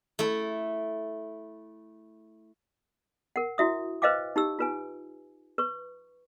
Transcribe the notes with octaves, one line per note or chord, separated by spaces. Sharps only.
A3 E4
A#4 F#5
E4 F#4 E5 D#6
B4 C5 D#5 F5 G5 D6
D#4 G4 E6
F4 B4 G#5
B4 C#6